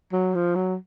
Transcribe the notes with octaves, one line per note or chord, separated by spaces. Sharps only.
F#3
F3
F#3